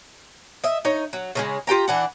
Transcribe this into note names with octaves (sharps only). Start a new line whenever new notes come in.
D#5 E5
D#4 C#5
F#3
C#3 F3 G#3
F4 G4 G5 A#5
E3 D4 F#5